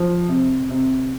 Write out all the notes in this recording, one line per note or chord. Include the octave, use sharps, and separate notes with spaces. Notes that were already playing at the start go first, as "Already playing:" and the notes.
Already playing: F3
C3
C3